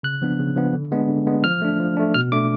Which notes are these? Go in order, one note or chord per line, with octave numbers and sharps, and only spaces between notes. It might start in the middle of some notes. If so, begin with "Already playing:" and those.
C#3 F#6
F3 B3 D4
C#3
F3 B3 D4
D3
G#3 B3 D4
D3
G#3 B3 D4
F3 F6
A3 D4
F3
A3 D4
B2 F6
A3 D4 D6